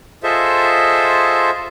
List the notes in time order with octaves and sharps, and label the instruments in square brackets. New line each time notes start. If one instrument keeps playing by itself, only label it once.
[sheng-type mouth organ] F4 G#4 A4 C5 D#5 E5